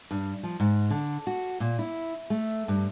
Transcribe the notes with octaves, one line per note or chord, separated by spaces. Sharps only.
G2
F3
G#2
D3
F#4
A#2
E4
A3
G2